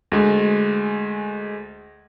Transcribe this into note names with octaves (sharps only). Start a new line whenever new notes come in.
D2 G#3